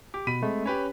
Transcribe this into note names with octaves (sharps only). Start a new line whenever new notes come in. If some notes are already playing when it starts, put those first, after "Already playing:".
G4 D6
B2 B5 B6 D#7
G#3 A3 C4
C#4 G4 B4 C#5